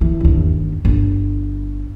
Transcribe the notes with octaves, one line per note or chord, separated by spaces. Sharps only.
E3
G1 D#2
G1